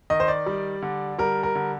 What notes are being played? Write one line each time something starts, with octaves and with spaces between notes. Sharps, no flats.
D#3 D#5
C5
D5
G3
D3
G3 A#4
A#4
D3